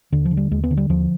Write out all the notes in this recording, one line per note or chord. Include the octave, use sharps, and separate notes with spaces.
D#2 D3
F3
D3
G3
D#2 G#3
B3
D3
G3
D#2 F3